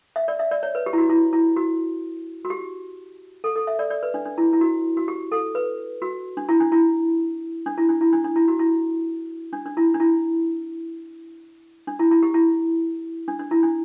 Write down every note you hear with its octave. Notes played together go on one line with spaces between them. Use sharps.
E5
D5
E5
D5
C#5
B4
G4
E4
F#4
E4
E4
F#4
F#4
G4
A4
A4
E5
D5
D5
B4
D4
D4
E4
E4
F#4
F#4
G4
A4
B4
F#4
D4
E4
D4
E4
D4
E4
D4
E4
D4
D4
E4
F#4
E4
D4
D4
E4
D4
E4
D4
E4
E4
G4
E4
D4
D4
E4
D4